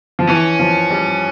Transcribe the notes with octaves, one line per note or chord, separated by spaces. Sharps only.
F3
E3 C#4
F3
G3